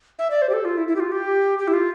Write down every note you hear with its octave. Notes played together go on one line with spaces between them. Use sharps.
E5
D5
C5
G4
A4
F4
E4
E4
G4
F4
G4
G4
E4
F4